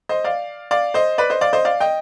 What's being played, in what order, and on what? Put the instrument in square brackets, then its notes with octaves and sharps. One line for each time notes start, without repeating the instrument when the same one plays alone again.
[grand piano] C5 D#5
D5 F5
D5 F5
C5 D#5
B4 D5
C5 D#5
D5 F5
C5 D#5
D5 F5
D#5 G5